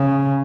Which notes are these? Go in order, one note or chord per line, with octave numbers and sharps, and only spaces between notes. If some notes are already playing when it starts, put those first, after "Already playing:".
Already playing: C#3